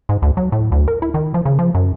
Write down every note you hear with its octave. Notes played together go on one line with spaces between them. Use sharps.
G#2
D2
F#3
A2
D2
A#4
E4
D#3
F3
C#3
F3
F#2